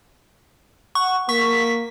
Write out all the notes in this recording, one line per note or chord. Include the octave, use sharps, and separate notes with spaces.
F#5 C#6
A#3 C#6 B6